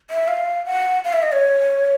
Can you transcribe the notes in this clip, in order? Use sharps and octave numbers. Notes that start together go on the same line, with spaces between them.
E5
F5
F#5
F5
E5
D#5
C#5